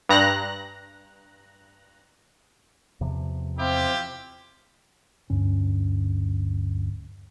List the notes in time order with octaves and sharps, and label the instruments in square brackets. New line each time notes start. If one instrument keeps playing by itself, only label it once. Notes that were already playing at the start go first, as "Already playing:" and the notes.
[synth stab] G2 A#5 F#6 A#6
[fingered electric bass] E2 C3 F3
[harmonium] C4 [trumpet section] E4 F4 G4
[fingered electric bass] D1 D2 G2 C#4